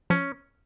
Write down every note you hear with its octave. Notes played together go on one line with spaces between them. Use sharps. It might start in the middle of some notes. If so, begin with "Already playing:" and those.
F3 C#4